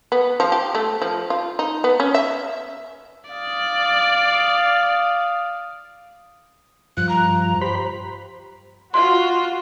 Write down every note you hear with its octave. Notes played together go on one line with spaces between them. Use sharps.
B3
F3
G4
A3
F3
F4
D#4
B3
C#4
E5
D5 F5 D#6
G2 F3 F#6
A#5
G4 C5 B5
F4 F#4 C6